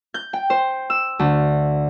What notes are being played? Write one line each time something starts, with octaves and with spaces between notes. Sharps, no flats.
G6
G5
C5
E6
D2